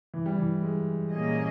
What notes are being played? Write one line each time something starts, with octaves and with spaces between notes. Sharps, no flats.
E3
G3
E3
G#3
A#2 A#3 C#4 G#4 D#5